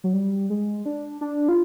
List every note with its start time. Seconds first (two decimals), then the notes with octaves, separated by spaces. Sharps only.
0.04 F#3
0.13 G3
0.50 G#3
0.86 D4
1.21 D4
1.49 F4